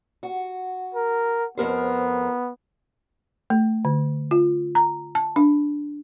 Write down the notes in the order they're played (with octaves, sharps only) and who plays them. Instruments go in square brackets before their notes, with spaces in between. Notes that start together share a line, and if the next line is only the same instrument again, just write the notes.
[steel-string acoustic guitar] F#4
[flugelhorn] A#4
[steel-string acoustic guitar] F2 A#4 C5 [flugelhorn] B3
[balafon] A3
D3
F4
A#5
A5
D4